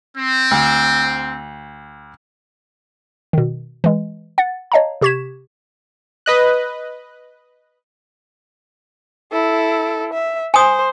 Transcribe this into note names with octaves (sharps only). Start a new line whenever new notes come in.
C4
D2
B2 D#3
E3 G#3
F#5 A6
C#5 D#5 F5 A5 A#5
C3 G4 C#6 G#6 B6 E7
B4 D#5 F#6
E4 A4
E5
C5 G#5 D#6